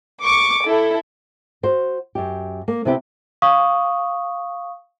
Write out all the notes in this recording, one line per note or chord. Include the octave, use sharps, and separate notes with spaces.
C#6 D6
E4 A4
F#4 C5
F#2 G4
A#3
C3 B3 C4 E4 G4
F5 C#6 D#6